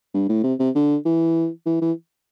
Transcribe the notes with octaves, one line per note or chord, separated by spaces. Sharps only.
G2
A2
C3
C3
D3
E3
E3
E3